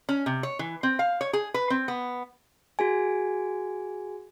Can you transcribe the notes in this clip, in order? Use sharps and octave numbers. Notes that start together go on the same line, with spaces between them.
C#4
C3
C#5
E3
C4
F5
C#5
G#4
B4
C4
B3
F#4 G#4 G#5